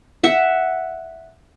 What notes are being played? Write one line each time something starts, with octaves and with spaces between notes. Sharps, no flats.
E5 F#5